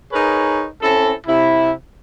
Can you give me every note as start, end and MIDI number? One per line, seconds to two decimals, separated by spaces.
0.12 0.66 63
0.12 0.66 68
0.12 0.66 70
0.12 0.66 71
0.12 0.66 73
0.83 1.13 60
0.83 1.13 61
0.83 1.13 64
0.83 1.13 69
1.27 1.72 48
1.27 1.72 64